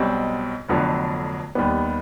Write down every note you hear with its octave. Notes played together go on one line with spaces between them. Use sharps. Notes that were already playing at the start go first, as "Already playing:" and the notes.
Already playing: B1 B2 G3 C4
F1 F2 D3 F#3 B3
D#2 D#3 G3 B3